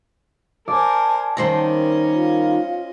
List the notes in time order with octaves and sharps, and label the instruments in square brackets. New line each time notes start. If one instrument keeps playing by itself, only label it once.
[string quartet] A#4 C5 G#5 [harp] D5 [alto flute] A5
[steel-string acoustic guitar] D#2 D#3 G3 [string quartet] C#4 D#5 [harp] C5 A#6
[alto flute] F4